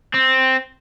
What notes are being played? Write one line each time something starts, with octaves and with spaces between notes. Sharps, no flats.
C4